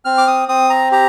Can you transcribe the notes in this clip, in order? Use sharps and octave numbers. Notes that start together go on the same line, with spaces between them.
C4 F6
D6
D#6
C4 D#6
A#5
G4 A#5